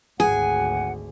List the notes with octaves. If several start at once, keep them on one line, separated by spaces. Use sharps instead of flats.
G#1 D2 G#4 F#5 G#5